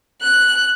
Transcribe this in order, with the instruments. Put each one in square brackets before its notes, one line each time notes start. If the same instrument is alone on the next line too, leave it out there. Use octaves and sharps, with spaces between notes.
[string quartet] F#6